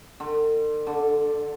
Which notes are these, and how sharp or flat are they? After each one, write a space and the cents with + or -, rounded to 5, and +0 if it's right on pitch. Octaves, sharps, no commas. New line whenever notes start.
D3 +40
D3 +0